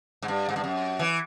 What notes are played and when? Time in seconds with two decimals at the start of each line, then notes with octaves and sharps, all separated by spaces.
0.22 G#2
0.28 G2
0.49 G#2
0.56 G2
0.64 F#2
0.99 E3